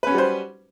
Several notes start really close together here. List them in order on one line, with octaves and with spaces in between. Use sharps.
B4 C#4 F#4 G3 C5